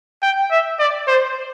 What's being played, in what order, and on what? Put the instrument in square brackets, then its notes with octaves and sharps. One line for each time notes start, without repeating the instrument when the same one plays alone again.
[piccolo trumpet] G5
E5
D5
C5